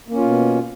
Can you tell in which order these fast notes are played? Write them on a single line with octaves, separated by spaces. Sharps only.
A#3 C#4 F4 B2